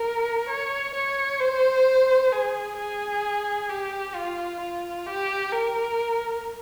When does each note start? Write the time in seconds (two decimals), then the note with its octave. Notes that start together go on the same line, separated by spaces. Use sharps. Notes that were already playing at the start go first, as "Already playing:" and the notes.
Already playing: A#4
0.49 C#5
0.95 C#5
1.40 C5
2.32 G#4
2.77 G#4
3.69 G4
4.15 F4
4.60 F4
5.07 G4
5.52 A#4